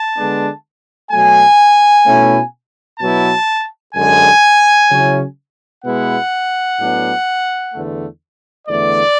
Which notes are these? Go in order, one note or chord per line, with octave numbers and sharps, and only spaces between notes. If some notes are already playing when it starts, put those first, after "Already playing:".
Already playing: A5
D3 G#3 B3 D4
B2 F#3 A3 G#5
B2 A3 C#4 E4
B2 F#3 B3 E4 A5
F#2 D3 G#3 G#5
C#3 F#3 C#4 E4
B2 G#3 B3 E4 F#5
A2 F#3 B3 D4
E2 D3 A3
E2 D3 A3 D5